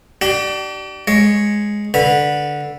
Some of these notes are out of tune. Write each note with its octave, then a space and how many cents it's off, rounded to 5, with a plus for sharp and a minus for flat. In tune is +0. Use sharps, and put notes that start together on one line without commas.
D4 +15 G4 -40
G#3 +0 C#5 +0
D3 +0 B4 -10